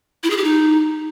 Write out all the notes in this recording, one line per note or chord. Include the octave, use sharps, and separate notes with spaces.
E4
G#4
G4
D#4